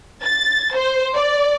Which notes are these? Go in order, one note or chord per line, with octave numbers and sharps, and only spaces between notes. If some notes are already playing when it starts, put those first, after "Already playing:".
A6
C5
D5